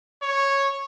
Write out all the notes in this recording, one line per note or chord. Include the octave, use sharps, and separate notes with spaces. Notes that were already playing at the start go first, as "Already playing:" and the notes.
C#5